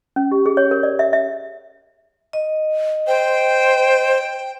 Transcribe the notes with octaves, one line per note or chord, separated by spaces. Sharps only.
C#4
G4
G#4
C#5
A#4
D5
E5
E5
D#5
C5 G5